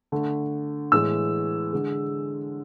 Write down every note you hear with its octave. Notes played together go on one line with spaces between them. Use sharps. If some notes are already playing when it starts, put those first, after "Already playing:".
D3 A3
A2 E3 G#3 E6
D3 G#3